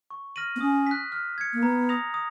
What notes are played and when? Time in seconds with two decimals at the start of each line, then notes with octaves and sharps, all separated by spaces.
0.10 C#6
0.36 F6 A#6 D#7 F#7
0.56 B3
0.61 C#4 D#6
0.87 F#6 B6
1.12 F6
1.38 G#6 C#7
1.54 A#3
1.63 B3 A#5
1.89 D#6 A#6 F7
2.14 D#6